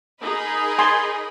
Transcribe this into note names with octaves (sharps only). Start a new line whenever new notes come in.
D#4 G#4 A#4 D#5 B5
G#5 C6